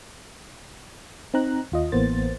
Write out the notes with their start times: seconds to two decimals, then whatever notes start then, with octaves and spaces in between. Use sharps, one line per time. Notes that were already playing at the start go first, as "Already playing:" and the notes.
1.34 C4 D#4 A#5 F#6
1.72 D#2 F4 D#5
1.92 A1 E3 A#3 B3 C5 A6